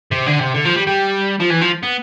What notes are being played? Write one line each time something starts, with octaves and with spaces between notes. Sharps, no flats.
C3
D3
C3
D3
F3
G3
G3
F3
E3
F3
B3